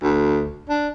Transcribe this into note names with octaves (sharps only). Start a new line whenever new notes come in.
D2
D4